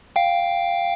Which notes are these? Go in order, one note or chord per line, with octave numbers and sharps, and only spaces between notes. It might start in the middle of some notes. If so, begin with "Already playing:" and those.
F5 G5